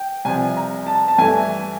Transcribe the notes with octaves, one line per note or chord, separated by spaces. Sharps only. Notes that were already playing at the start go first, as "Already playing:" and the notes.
Already playing: G5
C2 C3 F3 G#5
A#5
A5
A5
G2 E3 A3 G#5